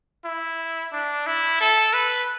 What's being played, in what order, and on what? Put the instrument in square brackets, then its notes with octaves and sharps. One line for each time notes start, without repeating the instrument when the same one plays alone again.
[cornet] E4
D4
E4
A4
B4